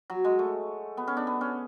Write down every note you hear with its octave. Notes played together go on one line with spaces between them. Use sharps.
F#3
G#3
A3
B3
C#4
D4
B3
C#4